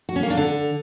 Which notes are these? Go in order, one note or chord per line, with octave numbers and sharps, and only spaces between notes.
F#4
C#4
A#3
D4
D3